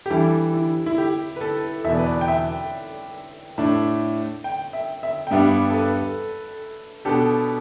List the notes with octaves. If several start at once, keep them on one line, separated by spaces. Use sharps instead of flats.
G4
E3 G3 D4 E4 A4
E4
E4
G4
B4
A4
E2 B2 B3 E5
D5
B4
D5
G5
E5
A2 A3 D4
G5
E5
E5
G5
G2 G3 B3 D4 E5
A4
B4
B2 B3 D4 G4 A4